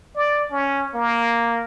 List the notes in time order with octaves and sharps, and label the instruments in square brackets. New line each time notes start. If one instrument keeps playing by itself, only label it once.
[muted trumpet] D5
C#4
A#3